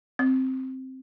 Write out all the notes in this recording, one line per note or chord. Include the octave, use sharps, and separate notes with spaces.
C4